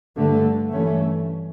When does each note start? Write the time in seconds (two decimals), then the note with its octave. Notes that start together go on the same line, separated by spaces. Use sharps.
0.16 G2 D3 A3
0.72 G2 E3 A3 C#4